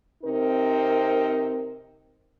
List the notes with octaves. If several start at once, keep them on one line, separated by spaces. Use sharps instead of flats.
C3 C4 D#4 A#4